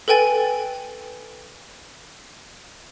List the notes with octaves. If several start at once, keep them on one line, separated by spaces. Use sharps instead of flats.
A4 B4 G5 G#5 A6